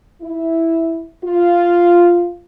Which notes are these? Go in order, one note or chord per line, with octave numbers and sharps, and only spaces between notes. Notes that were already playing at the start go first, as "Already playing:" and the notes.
E4
F4